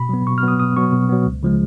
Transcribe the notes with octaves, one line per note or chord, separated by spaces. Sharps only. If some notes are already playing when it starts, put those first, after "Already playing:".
Already playing: B2 B5
F#3 B3
B2 C#6
F6
F#3 B3 D#6
B2 D#6
F#3 B3 C#6
B2
F#3 B3
C#2
C#3 F3 G#3